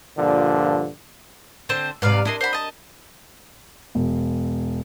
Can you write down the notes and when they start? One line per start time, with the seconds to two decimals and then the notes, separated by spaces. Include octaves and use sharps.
0.17 G2 A#2 D3 F3
1.69 D3 C4 C5 A5
2.02 G#2 C3 B4 D5 F5
2.25 D4 E4 A#4 D#5 C6
2.41 C5 F#5 B5
2.53 D#5 A5
3.95 E1